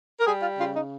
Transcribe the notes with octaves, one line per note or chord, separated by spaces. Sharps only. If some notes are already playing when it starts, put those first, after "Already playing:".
A#4
G3 G#4
F4
C#3 F4
D#4